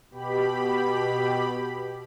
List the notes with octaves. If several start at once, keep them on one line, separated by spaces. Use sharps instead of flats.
B2 G4 B5